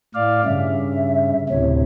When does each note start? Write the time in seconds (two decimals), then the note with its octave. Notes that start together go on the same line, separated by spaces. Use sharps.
0.15 A2 D5 F5
0.45 G2 C#3 E5
1.49 D2 A2 C3 C#5